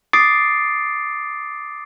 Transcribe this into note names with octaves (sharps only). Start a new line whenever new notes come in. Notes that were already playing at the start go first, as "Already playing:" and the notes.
D6 D#6 A6 C7 D7